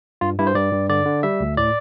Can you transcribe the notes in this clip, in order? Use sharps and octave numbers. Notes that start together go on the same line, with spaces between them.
G2 F4
G2 E4
C5
G2 D5
G2
D3 D5
D3
G3 E5
D2
A2 D5